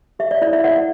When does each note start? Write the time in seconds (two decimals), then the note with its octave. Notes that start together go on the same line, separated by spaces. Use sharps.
0.19 G4 E5
0.31 D5
0.42 E4 D5
0.53 E5
0.64 E4 D5 F#5